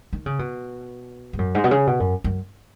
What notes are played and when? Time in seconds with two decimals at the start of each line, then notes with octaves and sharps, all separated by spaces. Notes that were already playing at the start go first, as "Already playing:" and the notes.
0.13 D#3
0.26 C#3
0.39 B2
1.33 G#2
1.39 F#2
1.55 G#2
1.64 B2
1.71 C#3
1.87 B2
2.00 F#2
2.24 F#2